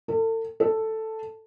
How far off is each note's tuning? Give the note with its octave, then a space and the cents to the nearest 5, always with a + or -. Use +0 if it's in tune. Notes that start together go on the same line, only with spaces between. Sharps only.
A4 +40
A4 +5